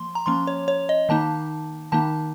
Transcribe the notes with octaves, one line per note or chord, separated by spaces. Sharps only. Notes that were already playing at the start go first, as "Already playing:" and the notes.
Already playing: F3 A#3 C6
A#5
F3 A#3 C#4 C6
C#5
C#5
D#5
D#3 A#3 D#4 A5
D#3 A#3 D#4 A5